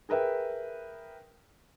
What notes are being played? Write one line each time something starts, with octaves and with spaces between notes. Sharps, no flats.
G#4 A#4 B4 E5 G5